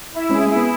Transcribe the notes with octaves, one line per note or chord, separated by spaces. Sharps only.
E4
G#3 C#4 G#4
G#3 E4
B3